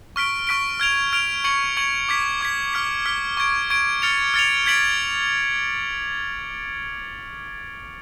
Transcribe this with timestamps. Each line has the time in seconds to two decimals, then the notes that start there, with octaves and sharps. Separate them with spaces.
0.16 C#6 F6 B6 D7
0.47 C#6 F6 B6 D7
0.80 F6 G#6 D7 F7
1.13 F6 G#6 D7 F7
1.44 C#6 G#6 C#7 F#7
1.77 C#6 G#6 C#7 F#7
2.09 D6 G#6 B6
2.41 D6 G#6 B6
2.73 D6 F6 B6
3.06 D6 F6 B6
3.37 C#6 G#6 D7
3.70 C#6 G#6 D7
4.02 F6 A6 C#7 F7
4.34 F6 A6 C#7 F7
4.66 G#6 B6 D7 F#7